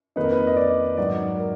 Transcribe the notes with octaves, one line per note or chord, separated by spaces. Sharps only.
F2 D#3 A#3 D#4 B4
A#4
B4
D#5
D5
G#2 D#3 F#3 D5
A#4